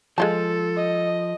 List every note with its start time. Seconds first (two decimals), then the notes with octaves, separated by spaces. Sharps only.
0.18 F3 G#3 F4 A4 A5
0.76 D#5